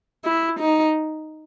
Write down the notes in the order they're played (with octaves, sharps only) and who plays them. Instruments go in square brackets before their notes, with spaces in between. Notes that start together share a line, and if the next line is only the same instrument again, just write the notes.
[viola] E4
D#4